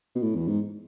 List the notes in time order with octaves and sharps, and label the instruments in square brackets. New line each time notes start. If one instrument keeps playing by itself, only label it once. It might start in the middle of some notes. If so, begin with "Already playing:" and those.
[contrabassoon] B2
A2
E2
G#2